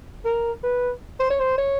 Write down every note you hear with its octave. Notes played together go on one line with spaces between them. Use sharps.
A#4
B4
C5
C#5
C5
C#5